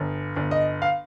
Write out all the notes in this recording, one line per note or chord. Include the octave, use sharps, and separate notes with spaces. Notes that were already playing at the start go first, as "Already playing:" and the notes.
Already playing: G1
G1
D#5
F5